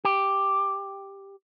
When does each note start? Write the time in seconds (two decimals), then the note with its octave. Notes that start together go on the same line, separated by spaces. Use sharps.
0.05 G4